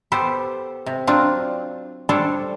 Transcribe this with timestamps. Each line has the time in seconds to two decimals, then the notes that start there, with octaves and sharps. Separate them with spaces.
0.12 B3 G4 A4 C5
0.86 C3
1.07 F#3 C4 D4 F4
2.09 G3 D4 A4 C5 C#5